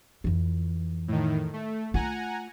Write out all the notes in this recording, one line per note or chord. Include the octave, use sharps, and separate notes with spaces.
F2 E3
A2 D#3
A3
A3 F4 F#5 G#5 A#5